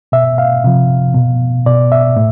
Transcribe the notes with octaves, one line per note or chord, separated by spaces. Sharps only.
B2 E5
F5
C3 F3
B2
B2 D5
E5
A2